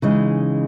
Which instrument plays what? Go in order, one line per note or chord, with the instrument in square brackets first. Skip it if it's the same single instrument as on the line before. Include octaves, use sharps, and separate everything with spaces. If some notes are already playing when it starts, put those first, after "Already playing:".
[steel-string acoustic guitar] C#3 E3 G#3 D#4